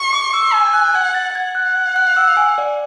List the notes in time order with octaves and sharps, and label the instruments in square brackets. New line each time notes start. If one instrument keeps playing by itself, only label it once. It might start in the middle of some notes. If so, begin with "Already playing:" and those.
Already playing: [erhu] C#6
[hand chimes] D6
E6
[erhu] G#5 [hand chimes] E6
[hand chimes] F#6
[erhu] F#5 [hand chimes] G#6
[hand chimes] A6
[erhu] F#5 [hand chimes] G#6
[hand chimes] F#6
G#6
F#6
E6
G#5
D5